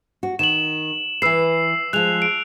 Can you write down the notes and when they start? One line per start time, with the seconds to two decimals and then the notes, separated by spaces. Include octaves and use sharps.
0.23 F#4
0.39 D#3 E7 F#7
1.22 E3 B4 E6 C7
1.93 F3 G#3 F#6 F7
2.22 D7